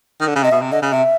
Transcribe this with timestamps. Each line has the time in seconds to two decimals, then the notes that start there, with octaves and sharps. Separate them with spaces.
0.21 D#3
0.28 D3
0.36 C#3
0.44 C3 D#5
0.52 B2 E5
0.62 C3
0.72 D3 D#5
0.82 C#3
0.92 C3 E5